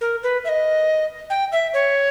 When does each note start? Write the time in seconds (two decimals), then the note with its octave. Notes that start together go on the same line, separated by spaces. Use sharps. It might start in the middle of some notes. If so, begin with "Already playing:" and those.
0.01 A#4
0.23 B4
0.45 E5
0.49 D#5
1.30 G5
1.52 E5
1.74 C#5